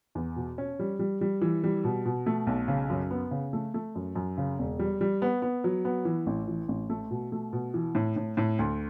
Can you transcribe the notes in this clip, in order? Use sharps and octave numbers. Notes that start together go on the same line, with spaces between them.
E2
B2
C#4
G3
G3
G3
E3
G3
B2
B2
A3
B1
C#3
F#2
B3
C#3
A3
A3
F#2
F#2
C#3
E1
G3
G3
B3
B3
F#3
B3
E3
A1
E3
A1
A3
B2
A3
B2
E3
A2
A2
A2
D2